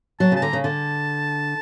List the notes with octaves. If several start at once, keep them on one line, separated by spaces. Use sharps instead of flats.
F#3 A5
C#3 A5
D3 A#5
C#3
D3 A5